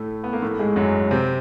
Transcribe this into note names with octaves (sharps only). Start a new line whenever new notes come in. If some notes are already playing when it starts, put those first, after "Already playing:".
Already playing: A2 A3
B3
A#3
A2 A3
G#2 G#3
F#2 F#3
C3 C4